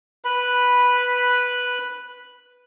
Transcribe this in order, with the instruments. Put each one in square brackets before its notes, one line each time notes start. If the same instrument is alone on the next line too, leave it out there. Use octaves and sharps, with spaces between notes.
[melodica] B4 B5